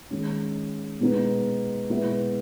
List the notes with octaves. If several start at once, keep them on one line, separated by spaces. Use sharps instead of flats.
D#3 G#3 C#4
B2 G#3 B3 D#4
B2 G#3 B3 E4